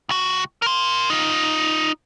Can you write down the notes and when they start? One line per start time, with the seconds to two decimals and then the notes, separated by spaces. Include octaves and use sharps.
0.09 C#2 F#4
0.62 A#4 C6
1.10 D#4 F4